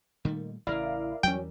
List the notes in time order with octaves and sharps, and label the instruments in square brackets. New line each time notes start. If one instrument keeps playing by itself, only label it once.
[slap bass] A#2 G3 A3 [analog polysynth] D#3
[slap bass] A1 C#3 E3 [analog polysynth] E4 F5 [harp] A#4 D5
[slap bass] E2 E3 G3 [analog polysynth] F#3 C#4 [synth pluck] G5